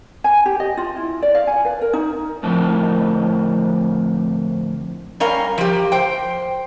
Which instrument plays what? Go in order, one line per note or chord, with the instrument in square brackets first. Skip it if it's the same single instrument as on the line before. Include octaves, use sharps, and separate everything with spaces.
[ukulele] G#5
G4
D#5
F4
E4
D5
F5
G#5
B4
A#4
D#4
[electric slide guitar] A2 D3 F3 C4 A#4 A5
[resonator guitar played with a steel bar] G3 C#4 A#4 F5
F3 G4
C5 G5